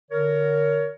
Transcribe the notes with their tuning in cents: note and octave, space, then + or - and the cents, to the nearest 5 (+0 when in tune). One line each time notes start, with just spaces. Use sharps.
D3 +0 A#4 +0 C#5 +20